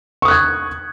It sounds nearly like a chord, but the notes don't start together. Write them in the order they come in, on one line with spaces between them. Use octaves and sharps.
C#6 D#6 F#6 G#6